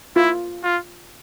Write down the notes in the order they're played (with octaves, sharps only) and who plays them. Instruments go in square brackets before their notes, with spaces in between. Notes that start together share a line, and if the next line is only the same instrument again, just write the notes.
[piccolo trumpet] E4 [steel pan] F4
[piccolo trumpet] F4